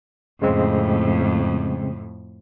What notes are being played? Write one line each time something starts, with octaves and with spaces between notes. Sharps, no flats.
F2 A2 C#3 G#3 C4